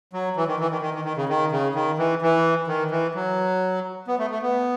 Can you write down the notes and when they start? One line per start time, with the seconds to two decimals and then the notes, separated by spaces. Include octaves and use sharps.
0.13 F#3
0.36 E3
0.48 D#3
0.59 E3
0.71 D#3
0.82 D#3
0.94 D#3
1.05 D#3
1.17 C#3
1.29 D#3
1.52 C#3
1.75 D#3
1.98 E3
2.22 E3
2.67 D#3
2.91 E3
3.15 F#3
4.07 B3
4.19 A3
4.30 A3
4.42 B3